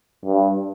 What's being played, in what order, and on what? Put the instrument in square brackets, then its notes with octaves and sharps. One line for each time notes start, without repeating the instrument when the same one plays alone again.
[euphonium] G2